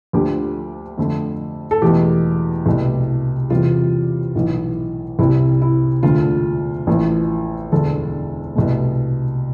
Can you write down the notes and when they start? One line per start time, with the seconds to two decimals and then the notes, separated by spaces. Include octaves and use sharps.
0.13 D2 D3 F3 A3 G4
0.97 F2 D3 A3
1.71 A4
1.82 E1 E2 B2 A3 G4
2.66 C2 B2 A3
3.50 E2 C3 G3 F4
4.35 B1 A2 E3
5.19 C2 C3 G3 E4
5.62 E4
6.03 E1 D2 D3 A3 F4
6.87 A1 A2 F3 A3
7.72 E1 D2 D3 A4
8.56 C2 B2 A3